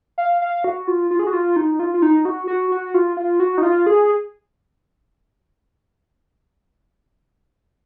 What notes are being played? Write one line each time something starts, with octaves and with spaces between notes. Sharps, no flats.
F5
F5
F#4
F4
F4
G#4
F#4
F4
D#4
F4
F4
D#4
F#4
F#4
F#4
F4
F4
F#4
D#4
F4
G#4